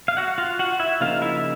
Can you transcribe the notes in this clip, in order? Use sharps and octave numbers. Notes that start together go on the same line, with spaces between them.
F5
F#4 F#5
F4 F5
F#4 F#5
E4 E5
C#3 F3 A#3 D#4 F4 F5
E4 E5